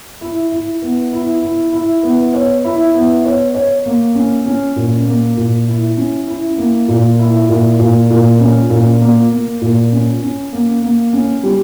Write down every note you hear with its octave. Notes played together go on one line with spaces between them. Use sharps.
E4
E4
B3
E4
E4
E4
B3
C#5
E4
B3
C#5
C#5
A#3
C#4
C#4
A#2
A#3
A#2
E4
C#4
E4
A#3
A#2
E4
A#2
A#2
A#2
C#4
A#2
A#3
A#3
A#2
C#4
C#4
A#3
A#3
C#4
G3